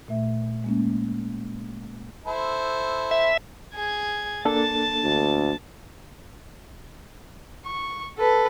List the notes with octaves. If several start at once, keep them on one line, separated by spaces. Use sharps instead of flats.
A#2 A3 E5
G#3 A#3 C#4
E4 A4 C5
E5
G#4 G#6
A#3 D4 A4 A5 A6
D2
C#6
A4 B4